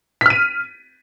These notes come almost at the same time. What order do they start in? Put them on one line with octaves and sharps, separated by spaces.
B6 F6 D#7